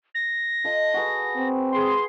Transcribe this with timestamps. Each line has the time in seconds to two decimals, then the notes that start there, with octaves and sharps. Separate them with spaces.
0.15 A#6
0.64 F4 A4 D#5
0.94 F#4 G#4 B4
1.36 C4
1.72 G#4 G5 C6